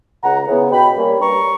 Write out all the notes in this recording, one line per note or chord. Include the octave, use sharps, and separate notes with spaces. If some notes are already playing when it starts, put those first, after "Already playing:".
C#2 F#5 A#5
C#3 E3 B3
B2 G5 B5
G3 A#3 C#4
G2 A#5 C#6